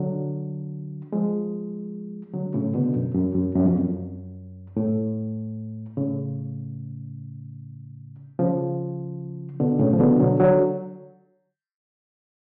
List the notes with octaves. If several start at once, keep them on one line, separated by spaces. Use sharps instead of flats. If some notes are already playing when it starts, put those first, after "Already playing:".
Already playing: D3 F#3
F3 G#3
D3 F#3
A2 C#3
B2 D3
F#2
F#2
F#2
F#2
F2
F#2
A2
A2 C#3
C#3 F3
B2 D3
A2 C#3
F3
B2 D3
D3 F#3
D3 F#3